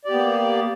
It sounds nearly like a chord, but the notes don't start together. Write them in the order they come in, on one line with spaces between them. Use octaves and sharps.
D5 G4 B3 A#3